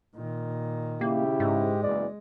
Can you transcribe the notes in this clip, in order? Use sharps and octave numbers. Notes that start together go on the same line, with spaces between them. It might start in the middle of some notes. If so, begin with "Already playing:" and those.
A#2 D#3
C#3 A#3 E4 G4
G#2 G#3
F#1 E2 D5